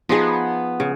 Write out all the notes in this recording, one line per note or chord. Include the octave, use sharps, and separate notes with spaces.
F3 B3 D#4 G#4
C#3